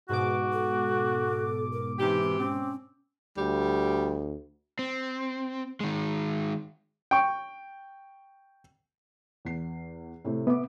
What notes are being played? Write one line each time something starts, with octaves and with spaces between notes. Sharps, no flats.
G#2 B2 F#4 G#4 D6
A4
A#4
C3 E3 D#4 G4
C4
C4 C#4
D2 G3
C4
D#3 G#3
G5 C#6
E2 C7
A2 C3 A3
B3 E5 D6